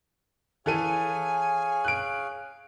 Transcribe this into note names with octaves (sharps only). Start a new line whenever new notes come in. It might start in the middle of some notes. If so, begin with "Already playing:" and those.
E3 G#4 A4 C#5 F5 G#5 D#7
F#6 D7